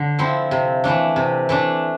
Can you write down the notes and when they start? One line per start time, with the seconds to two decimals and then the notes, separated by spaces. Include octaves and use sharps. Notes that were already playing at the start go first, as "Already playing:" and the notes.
Already playing: D3
0.19 F3 C4 E4
0.51 C3
0.84 E3 A3 D4
1.16 C3
1.49 E3 A3 D4